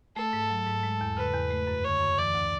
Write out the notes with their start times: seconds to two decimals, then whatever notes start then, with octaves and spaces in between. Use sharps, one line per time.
0.16 A3 A4
0.33 G#2
0.50 F#3
0.67 G#2
0.83 G#3
1.01 E2
1.17 C#3 B4
1.34 E2
1.51 A3
1.67 F#2
1.84 D3 C#5
2.01 F#2
2.18 E3 D5
2.34 D2